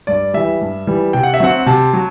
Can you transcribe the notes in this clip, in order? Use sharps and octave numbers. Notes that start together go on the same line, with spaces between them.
G2 D5
E3 G3 E5
G2
E3 G3
C3 G5
F#5
E5
F#3 C4 F#5
C3 A5
F#3